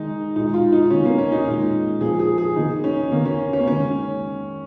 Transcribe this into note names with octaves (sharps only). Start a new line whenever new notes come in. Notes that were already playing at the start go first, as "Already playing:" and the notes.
Already playing: D#3 G#3 D#4
A#2 G#3 D#4
F4
D#4
D#3 A#3 C#4
A#3
C#4
D#4
A#2 G#3
A#2 F3 A#3 G#4
G#4
G#4
D#3 A#3 D#4
C#4
D#3 A#3
C#4
C#4
A#3
D#3 G#3 C#4